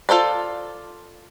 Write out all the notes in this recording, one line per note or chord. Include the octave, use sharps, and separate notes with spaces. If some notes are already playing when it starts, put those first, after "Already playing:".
F4 A4 C5 D5